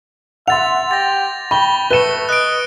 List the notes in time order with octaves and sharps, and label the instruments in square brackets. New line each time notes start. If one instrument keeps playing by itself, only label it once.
[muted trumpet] E5 [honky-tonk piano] F#5 C6 [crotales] A6 F7
[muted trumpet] G4 [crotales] A6 A#6
[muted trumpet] G5 [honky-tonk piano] B5 [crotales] C#6 G7
[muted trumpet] A3 [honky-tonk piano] B4 E7 [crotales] C#7 G7
[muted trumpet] D#5 [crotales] F#6 D7